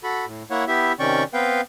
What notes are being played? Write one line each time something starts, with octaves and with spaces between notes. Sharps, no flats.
F#4 A4 B5
A2
A#3 E4 C#5 F#5
B3 E4 G4 E5
C3 D#3 C#4 D5 G5 C#6
B3 C4 B4 F5 G5